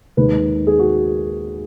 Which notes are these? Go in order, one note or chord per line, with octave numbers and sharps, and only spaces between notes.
D#2 D#3 G#3 B4
G#4
F#4